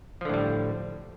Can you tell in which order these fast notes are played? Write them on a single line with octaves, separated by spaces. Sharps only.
F3 D3 A2 G3